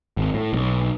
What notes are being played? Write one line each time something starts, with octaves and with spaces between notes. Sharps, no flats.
G#1
A2
B1